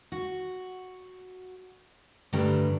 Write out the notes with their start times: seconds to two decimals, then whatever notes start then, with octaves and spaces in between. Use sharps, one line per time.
0.12 F#4
2.33 G2 D3 G3 A3 G5 A#5